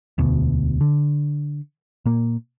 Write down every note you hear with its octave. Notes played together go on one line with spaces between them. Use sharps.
E1 D2 B2
D3
A#2 A#3